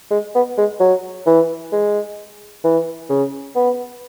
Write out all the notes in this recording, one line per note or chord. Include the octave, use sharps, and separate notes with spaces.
G#3
B3
G#3
F#3
E3
G#3
E3
C#3
B3